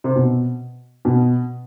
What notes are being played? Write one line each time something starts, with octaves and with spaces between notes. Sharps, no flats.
C3
B2
B2